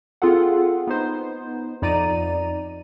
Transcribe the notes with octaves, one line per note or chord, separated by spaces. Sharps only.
C4 F4 G#4 A4 F#5
B3 D#4 C5
F2 D#4 D5 A#5 D#7